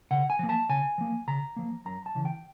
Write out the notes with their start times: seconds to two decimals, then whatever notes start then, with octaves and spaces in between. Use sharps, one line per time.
0.11 C#3 F#5
0.30 G#5
0.39 F3 A#3
0.49 A5
0.69 C#3 G#5
0.98 F3 A#3
1.27 C#3 A#5
1.56 F3 A#3
1.85 F#2 A#5
2.06 A5
2.15 C#3 E3
2.25 G5